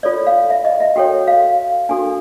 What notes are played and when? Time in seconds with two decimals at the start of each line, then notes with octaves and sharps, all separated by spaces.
0.03 F4 A4 C#5 D5
0.27 F5
0.50 E5
0.65 D#5
0.80 E5
0.96 F#4 A4 C#5 G5
1.28 F5
1.89 D4 F#4 A4 G#5